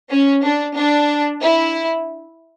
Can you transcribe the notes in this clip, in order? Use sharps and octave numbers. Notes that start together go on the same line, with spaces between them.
C#4
D4
D4
E4